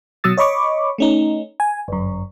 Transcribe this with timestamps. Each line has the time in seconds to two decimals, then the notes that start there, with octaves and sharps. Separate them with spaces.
0.24 B2 F#3 D#6 E6 A6
0.37 C#5 D#5 B5 C#6 D6
0.98 A3 C#4 D#4
1.60 G#5
1.88 G1 F#2